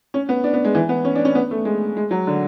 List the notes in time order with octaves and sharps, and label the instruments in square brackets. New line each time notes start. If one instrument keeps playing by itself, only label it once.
[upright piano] C#4
B3
D4
B3
G#3
E3
B3
C#4
D4
C#4
B3
A3
G#3
G#3
F#3
D3